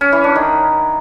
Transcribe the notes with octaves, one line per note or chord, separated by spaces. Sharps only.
C#4
E3
D4
D#3